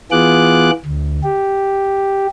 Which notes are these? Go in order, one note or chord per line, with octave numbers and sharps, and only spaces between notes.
E3 B3 F4 G#4 D6 F#6
D2
G4